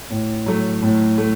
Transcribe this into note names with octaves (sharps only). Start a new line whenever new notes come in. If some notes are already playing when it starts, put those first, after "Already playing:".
A2
F#3 A3
A2
A3